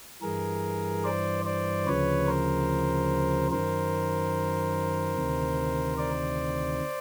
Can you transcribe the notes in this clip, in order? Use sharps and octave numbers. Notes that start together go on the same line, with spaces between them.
G2 E3 G#4 A#4
C5 D5
C5 D5
D2 C#3 F3 B4 C#5
A#4 C5
F#2 D#3 A#4 C5
D2 C3 D#3
C5 D5